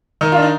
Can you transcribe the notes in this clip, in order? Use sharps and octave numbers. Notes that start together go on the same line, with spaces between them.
D#3 D#4
D4 F4
D#4